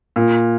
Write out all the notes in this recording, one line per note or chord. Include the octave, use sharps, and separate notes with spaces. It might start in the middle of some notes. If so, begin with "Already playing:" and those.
A#2